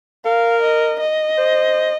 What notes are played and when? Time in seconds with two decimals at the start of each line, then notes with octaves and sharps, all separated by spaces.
0.25 A#4 F5
0.62 D#5
1.00 D#5
1.38 C5